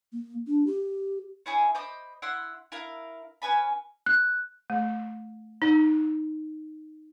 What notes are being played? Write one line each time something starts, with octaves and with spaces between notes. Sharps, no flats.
A#3
D4
G4
C#4 E4 G#4
C5 D#5 B5 D6
E4 F#5 B5 C6
E4 A#4 F5
C#4 B4 G#5 B5
F#6
A3
D#4